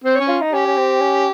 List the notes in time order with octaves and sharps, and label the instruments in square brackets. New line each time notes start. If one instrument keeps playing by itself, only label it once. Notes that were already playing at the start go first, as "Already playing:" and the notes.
[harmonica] C4 [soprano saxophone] C5
[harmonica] C#4 [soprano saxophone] C#5
[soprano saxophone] F4
D#4
[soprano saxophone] C#4 [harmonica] G4
[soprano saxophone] C#4
C4
C#4